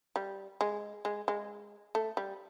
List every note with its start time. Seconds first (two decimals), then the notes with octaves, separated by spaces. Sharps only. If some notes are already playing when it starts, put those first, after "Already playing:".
0.16 G3
0.61 G#3
1.05 G#3
1.28 G#3
1.95 A3
2.17 G3